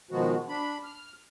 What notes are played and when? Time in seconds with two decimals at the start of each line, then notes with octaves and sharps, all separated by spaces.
0.11 B2 D#3 F3 G#3 B3 F#4
0.49 D4 B5
0.83 F6